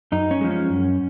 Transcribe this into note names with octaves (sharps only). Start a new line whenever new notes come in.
F#2 D#4
C#4
F3 G#3
C#4
F#2